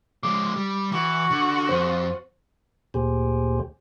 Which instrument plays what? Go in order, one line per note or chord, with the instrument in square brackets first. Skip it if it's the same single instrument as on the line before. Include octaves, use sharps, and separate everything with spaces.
[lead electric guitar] F3 G#3 [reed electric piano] D6
[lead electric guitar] G3
[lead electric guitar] E3 [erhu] F#4
[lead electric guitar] D3
[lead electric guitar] F2 [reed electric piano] C5
[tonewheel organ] D2 A#2 G4 G#4 C5